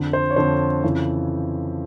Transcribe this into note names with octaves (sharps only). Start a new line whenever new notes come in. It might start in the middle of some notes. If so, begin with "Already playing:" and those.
Already playing: F2 D3
C5
C#5
F2 D3 C5
F2 C#3 E3